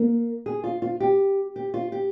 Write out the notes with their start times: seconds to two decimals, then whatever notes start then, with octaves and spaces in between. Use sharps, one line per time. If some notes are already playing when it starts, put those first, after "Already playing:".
Already playing: A#3
0.46 G#4
0.64 F4
0.82 F4
1.00 G4
1.56 G4
1.74 F4
1.92 G4